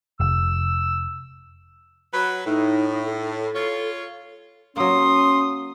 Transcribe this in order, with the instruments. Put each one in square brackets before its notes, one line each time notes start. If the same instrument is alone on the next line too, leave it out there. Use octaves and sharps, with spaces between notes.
[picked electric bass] F1 [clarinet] E6
[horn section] F#3 B4
[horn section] A2 [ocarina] D#4
[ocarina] A4
[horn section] F4 C#5
[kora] F#3 A#3 [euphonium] C#4 [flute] C6 [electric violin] D#6